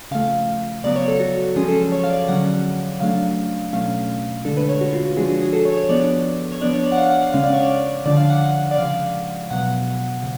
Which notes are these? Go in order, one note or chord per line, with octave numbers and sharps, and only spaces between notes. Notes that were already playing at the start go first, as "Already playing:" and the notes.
C#3 F3 A3 F5
C#3 F#3 B3 D5
C#5
A4
F#4
F3 G#3 C#4 G#4
A4
C#5
F5
D5
D3 F#3 C#4 F#5
C#3 F#3 A3 D4 F5
B2 F#3 A3 C#4 F5
D3 G#3 D4 A4
B4
C#5
F#4
F4
F#4
F3 G#3 D4 G#4
F#4
G#4
A4
C#5
C#5
F3 B3 D4 D5
C#5
F3 B3 D4 D5
C#5
D5
F#5
F5
F#5
F5
C#3 G#3 C#4 F5
D5
C#5
D5
D3 F3 G#3 D4 D5
F5
F#5
D5
C#3 F3 G#3 F5
B2 F#3 B3 F#5
C#3